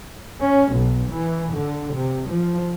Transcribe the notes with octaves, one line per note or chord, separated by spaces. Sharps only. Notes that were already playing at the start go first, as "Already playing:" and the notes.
C#4
B1
E3
D3
C3
F3